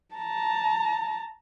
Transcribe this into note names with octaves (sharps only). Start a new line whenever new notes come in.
A5 A#5